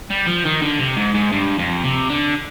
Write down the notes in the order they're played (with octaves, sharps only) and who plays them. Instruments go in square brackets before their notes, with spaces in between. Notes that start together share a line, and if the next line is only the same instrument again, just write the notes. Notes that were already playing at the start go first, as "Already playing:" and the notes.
[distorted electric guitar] G3
F3
D#3
D3
C3
G#2
G#2
G2
F2
C3
D3